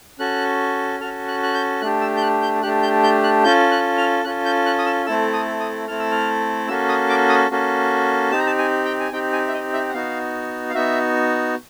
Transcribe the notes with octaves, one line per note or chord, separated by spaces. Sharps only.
C#4 F#4 A4 F#6
C#4 F#4 A4 F6
F#6
F#6
G6
A3 D4 G4 F#6
E6
G6
F#6
G6
A3 D4 G4 F#6
G6
G6
F#6
C#4 F4 A4 G6
F#6
F6
C#4 F4 A4 F#6
G6
F#6
D#6
E6
A3 C4 E4 A4 E6
D#6
D#6
A3 C4 E4 A4 F6
E6
F6
A#3 C#4 F#4 A4 E6
D#6
D6
D#6
A#3 C#4 F#4 A4
C4 D#4 G4 A5
A#5
A5
G#5
G5
G#5
C4 D#4 G4 G5
G#5
E5
D#5
E5
F#5
B3 D#4 F#4 F5
F5
B3 D#4 F#4 E5